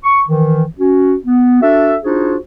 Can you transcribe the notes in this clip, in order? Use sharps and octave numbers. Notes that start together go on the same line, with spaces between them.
C#6
D#3 E3
C#4 F#4
B3
D4 F#4 A4 E5
D4 D#4 F4 F#4 G#4 C5